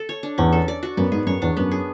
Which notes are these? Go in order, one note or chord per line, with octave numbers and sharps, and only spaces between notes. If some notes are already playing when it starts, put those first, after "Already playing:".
Already playing: A4
C#5
D4
E2 C#4
A4
D5
F#4
F#2 B3
G#2 G#4
F#2 C#5
E2 D4
F#2 B3
G#4